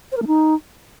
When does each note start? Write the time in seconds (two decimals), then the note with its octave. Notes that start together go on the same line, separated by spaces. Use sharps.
0.12 C5
0.17 A#4
0.22 A3
0.27 D#4